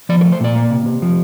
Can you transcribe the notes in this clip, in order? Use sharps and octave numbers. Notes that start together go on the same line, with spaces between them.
F3 D5
A#4
A3
C5
A#2 D5
A#3
C3
C3
F3